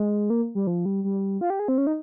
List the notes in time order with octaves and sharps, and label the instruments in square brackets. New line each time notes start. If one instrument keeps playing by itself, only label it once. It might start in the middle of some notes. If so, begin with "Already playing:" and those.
Already playing: [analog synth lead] G#3
A#3
G3
F3
G3
G3
F4
G4
G#4
C4
C#4
D#4